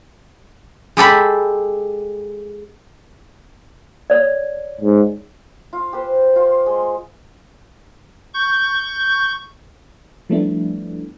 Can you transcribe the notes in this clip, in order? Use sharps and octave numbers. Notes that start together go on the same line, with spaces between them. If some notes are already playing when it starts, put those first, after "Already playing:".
G#3 G4 A4 B5
C#5 D5
G#2
F4
G4 B4 C5
F4 C6
G#3
C#6 G6
F3 G3 A3 B3 D4 E4